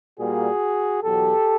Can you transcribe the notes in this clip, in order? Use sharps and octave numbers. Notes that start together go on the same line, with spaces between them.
A#2 G3 A#3 F#4 G#4
E2 B2 F#3 G4 A4